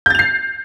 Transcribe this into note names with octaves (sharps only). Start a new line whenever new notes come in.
G6 A6 C7 F7